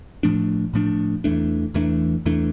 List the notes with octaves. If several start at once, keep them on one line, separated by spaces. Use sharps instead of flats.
A2 F3 A3 D4
A2 F3 A3 D4
E2 E3 A3 D4
E2 E3 A3 D4
E2 E3 A3 D4